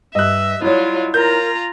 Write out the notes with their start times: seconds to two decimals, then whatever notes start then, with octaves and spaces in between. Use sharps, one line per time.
0.15 G2 D#5 E5 F#6
0.62 F#3 E4 F4 C#5 D5
1.14 F4 A#4 A#5 G6